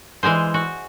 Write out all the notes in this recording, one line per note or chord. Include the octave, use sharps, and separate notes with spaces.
E3 G#3 G#4 C5
F#4